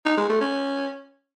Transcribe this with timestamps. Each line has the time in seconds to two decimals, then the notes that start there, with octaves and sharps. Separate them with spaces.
0.06 D#4
0.18 G#3
0.29 A3
0.41 C#4